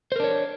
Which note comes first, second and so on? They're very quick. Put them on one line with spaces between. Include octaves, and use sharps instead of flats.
C5 A#4 D4 C#5